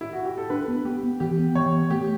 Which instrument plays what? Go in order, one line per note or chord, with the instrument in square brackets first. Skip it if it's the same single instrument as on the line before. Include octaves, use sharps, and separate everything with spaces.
[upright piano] E4
F#4
G4
A4
[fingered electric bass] D4 [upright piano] B4
[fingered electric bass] B3
[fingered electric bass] B3 [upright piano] G4
[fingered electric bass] B3
[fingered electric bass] E3 [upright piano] G4
[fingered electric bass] B3
[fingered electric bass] E3 [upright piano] C#5
[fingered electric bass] B3
[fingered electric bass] A3 [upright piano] G4